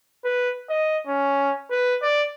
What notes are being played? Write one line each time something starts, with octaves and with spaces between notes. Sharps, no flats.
B4
D#5
C#4
B4
D5